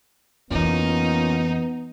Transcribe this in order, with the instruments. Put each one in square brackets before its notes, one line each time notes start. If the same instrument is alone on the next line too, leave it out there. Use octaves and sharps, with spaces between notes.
[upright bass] F2 E3 [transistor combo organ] A#3 C#4 F4 [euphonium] B3 [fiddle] D#4